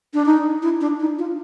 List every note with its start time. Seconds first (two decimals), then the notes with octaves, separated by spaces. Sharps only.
0.14 D4
0.26 D#4
0.62 E4
0.81 D4
1.00 D#4
1.19 F4